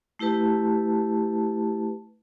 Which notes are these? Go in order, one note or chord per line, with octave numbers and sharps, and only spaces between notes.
A3 E4 G4 B4 A5